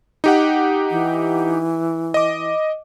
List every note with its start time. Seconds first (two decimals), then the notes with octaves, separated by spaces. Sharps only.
0.24 D#4 G4 F#5
0.91 E3
2.14 D#5 D6